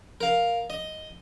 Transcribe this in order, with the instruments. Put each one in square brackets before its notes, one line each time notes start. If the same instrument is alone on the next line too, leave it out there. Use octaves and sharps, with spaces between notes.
[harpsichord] A#4 F5
D#5